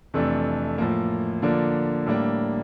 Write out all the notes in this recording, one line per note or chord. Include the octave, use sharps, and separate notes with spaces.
F2 C3 E3 A3 D4
A2 F3 A#3
D3 F3 A#3 D4
A2 G3 A#3 D4